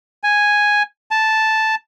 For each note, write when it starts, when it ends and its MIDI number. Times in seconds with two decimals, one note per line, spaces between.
0.24 0.83 80
1.11 1.75 81